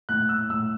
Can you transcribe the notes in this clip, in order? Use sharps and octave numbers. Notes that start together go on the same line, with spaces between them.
A2 F#6
E6
A2 E6